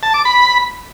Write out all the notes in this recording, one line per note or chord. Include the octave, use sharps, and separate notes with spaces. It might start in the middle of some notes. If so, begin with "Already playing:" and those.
A5
D6
B5